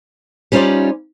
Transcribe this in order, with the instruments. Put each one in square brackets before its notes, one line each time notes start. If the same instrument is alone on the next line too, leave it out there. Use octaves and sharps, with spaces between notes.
[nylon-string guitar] G3 C#4 D#4 F4 C5 D5